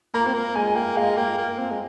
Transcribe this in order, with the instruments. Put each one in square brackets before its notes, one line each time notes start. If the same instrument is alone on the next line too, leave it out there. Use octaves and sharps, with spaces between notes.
[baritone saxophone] A#3 [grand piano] A#5
[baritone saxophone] C4
A#3
[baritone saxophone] G#3 [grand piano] G#5
[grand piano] G#5
[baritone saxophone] A#3 [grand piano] G5
[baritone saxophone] G#3 [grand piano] F5
[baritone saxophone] A#3 [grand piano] G5
[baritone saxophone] A#3
C4
G#3